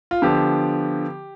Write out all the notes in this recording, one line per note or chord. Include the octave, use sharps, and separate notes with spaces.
F4
D3 F3 B3 G4